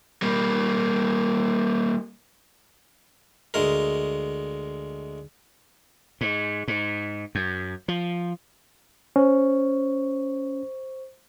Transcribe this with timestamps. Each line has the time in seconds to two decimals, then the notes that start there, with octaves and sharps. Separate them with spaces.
0.22 G3 A#3
3.54 D2 G#3 A#4
6.21 G#2
6.68 G#2
7.35 F#2
7.88 F3
9.16 C#4 C5 C#6